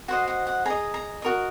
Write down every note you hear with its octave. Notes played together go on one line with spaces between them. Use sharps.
F#4 C5 D#5 F#5
F#5
F#5
G#4 D#5 A#5
A#5
F#4 A#4 D#5